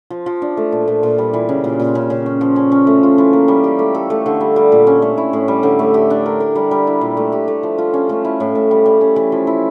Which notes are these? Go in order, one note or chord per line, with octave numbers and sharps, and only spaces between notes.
F3
F3
D4
A3
A#2
A#2
A#2
G3
E3
C#3
A#2
A#2
C#3
C#3
C#4
F3
C#4
C#4
A3
F4
E3
A#3
G3
G4
A3
A4
A3
D3
G3
G3
A#2
C#4
A3
E4
A2
G3
D3
A3
G4
D4
A#4
A#4
G3
G3
E4
A#2
A3
G4
A3
F3
F4
C#4
A3
E4
A2
A2
G3
G3
C#4
E3
F3
E4